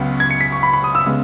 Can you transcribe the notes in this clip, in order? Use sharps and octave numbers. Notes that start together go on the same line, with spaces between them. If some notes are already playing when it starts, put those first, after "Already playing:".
Already playing: C#2 C#3 F#3 B3
G#6
C#7
B6
C#6
B5
B5
D#6
E6
C#3 G#3 B3